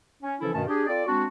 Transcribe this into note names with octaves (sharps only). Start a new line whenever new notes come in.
C#4
C#3 E3 F3 C#4 E4 A4
G2 B2 D#3 A3 C#4 A5
D4 G4 G#4
C4 F4 A4 D5
G#3 C4 D4 F#4